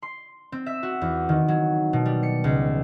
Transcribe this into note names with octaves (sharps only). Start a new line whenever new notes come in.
C6
C4
E5
F#4
E2
D#3
F#3
B2
G3
C#7
C#2